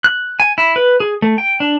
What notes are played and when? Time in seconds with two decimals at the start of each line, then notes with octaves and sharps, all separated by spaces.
0.04 F#6
0.40 G#5
0.58 E4
0.76 B4
1.00 G#4
1.22 A3
1.38 G5
1.60 D4